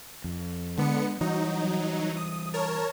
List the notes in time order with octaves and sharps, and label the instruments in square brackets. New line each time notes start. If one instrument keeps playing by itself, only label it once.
[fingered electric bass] F2
[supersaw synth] D3 B3 C#7 [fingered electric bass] G#3
[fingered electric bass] E3 G3 [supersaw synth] F#3 D#4
[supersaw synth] D#6
A#4 C#5 A5